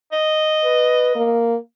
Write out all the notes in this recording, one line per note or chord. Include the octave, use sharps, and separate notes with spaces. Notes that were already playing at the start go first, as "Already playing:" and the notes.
D#5
B4
A#3